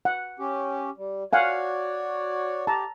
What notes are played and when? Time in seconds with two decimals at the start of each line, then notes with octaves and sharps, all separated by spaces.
0.05 F#5
0.39 C#4 G4
0.98 G3
1.33 F#4 C#5 D5 F5 F#5 G#5
2.67 G4 A5 A#5